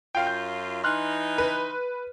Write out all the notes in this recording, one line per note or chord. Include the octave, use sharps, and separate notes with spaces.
F#2 F4 F5 G5
G6
E3 D#4 C6 F6 F#6
B4